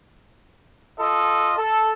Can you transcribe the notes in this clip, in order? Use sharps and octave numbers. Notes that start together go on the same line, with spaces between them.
F4 A4 D#5
A4